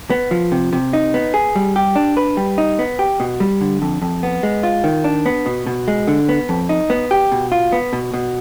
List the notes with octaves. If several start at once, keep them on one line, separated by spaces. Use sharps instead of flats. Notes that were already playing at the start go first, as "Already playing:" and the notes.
B3
F3
C3
C3
D#4
B3
G#4
G3
G4
D4
B4
G3
D#4
B3
G4
B2
G3
D3
F2
F2
B3
G#3
F4
D#3
D4
B3
B2
B2
G#3
D3
B3
F2
D#4
B3
G4
B2
F4
B3
B2
B2